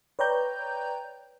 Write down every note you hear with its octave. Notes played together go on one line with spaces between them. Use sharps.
B4 C#5 D5 G5 A#5 G6